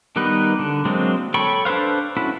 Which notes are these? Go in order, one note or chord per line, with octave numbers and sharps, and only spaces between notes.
D#3 G3 B3 D#4 B4
D3
F#3 G#3 A#3 C4 D4
A4 C#5 G5 B5 C#6
D4 A4 B4 C5 F5
C#4 E4 F#4 A4 B5